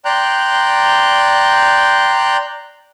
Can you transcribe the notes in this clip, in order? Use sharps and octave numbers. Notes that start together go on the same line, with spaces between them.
D5 G5 A#5 C6 F#6 G6